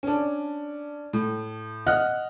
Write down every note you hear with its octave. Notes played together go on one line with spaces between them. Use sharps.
C#4 D4
A2
D#5 F#5 F6 F#6